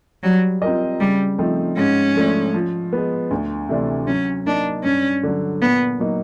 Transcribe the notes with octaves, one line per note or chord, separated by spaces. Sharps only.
F#3 G3
C4 F4 A#4 D#5
C#3 G3
F3 A3 C4 D#4
G#2 C#4
F3 A3 D4
F3
G#3 B3
D2
C3 E3 A3 D4
F#3 C#4
A#3 D4 D#4
G2 C#4
D3 F#3
A#2 B3
F#3 A#3 D#4